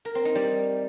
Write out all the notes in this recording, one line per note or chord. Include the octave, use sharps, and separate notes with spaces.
A#4
C4
D#4
G3